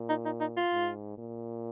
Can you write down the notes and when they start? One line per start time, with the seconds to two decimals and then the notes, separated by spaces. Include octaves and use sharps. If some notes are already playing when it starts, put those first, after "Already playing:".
Already playing: A#2
0.09 D#4
0.25 D#4
0.40 D#4
0.57 F4
0.72 G#2
1.18 A#2